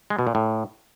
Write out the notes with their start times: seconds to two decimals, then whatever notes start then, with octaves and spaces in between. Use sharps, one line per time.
0.10 G#3
0.19 B2
0.27 A#2
0.35 A2